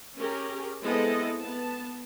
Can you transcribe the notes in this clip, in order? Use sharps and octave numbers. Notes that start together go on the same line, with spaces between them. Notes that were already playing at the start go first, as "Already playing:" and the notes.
C#4 G4 G#4 A#4
G#3 B3 C4 E4 A4 D#5
B3 A5